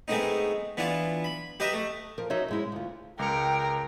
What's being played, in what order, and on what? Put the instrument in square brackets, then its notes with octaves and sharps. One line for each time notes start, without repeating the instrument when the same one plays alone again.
[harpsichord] G#3 A3 B3 C4 D#4
E3 B3 D4 F4
B5
G4 B4 D#5 E5 A#5
A3
[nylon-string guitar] F3 A#4
D#4 F#4 C#5 D#5 E5
G#2 G#3 E4
D2 F4
[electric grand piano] C#2 C#7 [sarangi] A#4 [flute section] G5